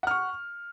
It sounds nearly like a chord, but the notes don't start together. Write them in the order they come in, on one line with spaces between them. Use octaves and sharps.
F#5 F6 C#6